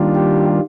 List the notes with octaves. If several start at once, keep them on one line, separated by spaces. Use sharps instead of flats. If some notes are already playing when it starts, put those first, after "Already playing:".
Already playing: D#3 G3 A#3 D4 F4
G4